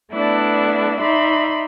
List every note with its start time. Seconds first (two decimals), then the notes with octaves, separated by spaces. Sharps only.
0.13 A3 B3 D4 E4 D5
0.99 D#4 D5 E5 B5 C6